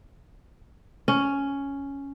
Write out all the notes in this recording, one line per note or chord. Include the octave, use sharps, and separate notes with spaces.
C#4